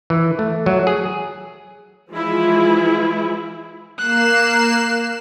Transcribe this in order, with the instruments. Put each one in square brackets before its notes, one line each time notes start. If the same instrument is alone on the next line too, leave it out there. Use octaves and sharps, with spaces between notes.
[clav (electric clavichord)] E3
A3
F#3
G#4
[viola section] E3 F3 G#3 E4 F4
[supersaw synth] A#3 C7 E7 [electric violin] F#6